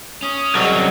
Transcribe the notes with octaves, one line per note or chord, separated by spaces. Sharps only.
C#4 D#6
C2 F#3 G#4 D#5 F#5